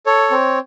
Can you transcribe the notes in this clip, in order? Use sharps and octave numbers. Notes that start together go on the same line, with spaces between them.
A4 C#5
C4